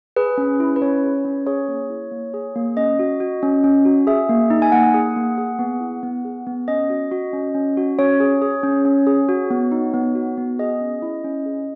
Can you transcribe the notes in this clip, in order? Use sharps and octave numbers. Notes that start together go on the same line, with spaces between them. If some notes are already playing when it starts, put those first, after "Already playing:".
G#4 B4
C#4
E4
B4
C#4 C#5
G#4
C#4
G#4 C#5
A#3
E4
A#3
G#4
A#3
C#4 D#5
F#4
F#4
C#4
C#4
F#4
G#4 E5
A#3
D#4
G#5
A#3 F#5
G#4
A#3
G#4
B3
E4
B3
G#4
B3
C#4 D#5
F#4
F#4
C#4
C#4
F#4
C#4 C#5
G#4
G#4
C#4
C#4
G#4
F#4
B3
D#4
B3
F#4
B3
G#4 D#5
C#4
E4
C#4
G#4